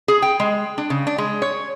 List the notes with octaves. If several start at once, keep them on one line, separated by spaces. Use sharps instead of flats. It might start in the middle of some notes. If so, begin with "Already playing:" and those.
G#4
G5
G#3
D4
C#3
D4
G#3
C#5